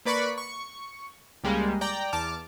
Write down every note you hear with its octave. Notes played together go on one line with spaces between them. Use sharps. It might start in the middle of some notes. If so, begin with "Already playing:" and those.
A#3 B4 D5 B5 C#6 F#6
C#6
C#2 G3 G#3 A#3
D5 G5 A#5
E2 A5 D6 F6